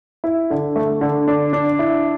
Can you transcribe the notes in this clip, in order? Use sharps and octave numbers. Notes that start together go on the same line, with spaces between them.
E4
D3
A3
D3
D4
D4
E4